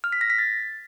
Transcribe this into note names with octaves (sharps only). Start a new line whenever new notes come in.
F6
B6
A#6
B6
A6